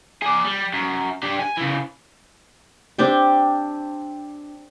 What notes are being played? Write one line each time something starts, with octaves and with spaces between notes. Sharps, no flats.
G#4 D5
G3
F#2
D4 G4
G#5
C#3 E3
C4 D4 G4 G5